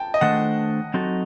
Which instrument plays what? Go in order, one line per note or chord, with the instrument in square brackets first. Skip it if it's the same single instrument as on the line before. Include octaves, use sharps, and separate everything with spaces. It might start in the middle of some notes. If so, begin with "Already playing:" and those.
Already playing: [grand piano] G5 A5
D#5
[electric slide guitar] D#3 A3 D4 A4 C5 [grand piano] F#5
[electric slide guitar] F#3 C4 D#4 F#4 A4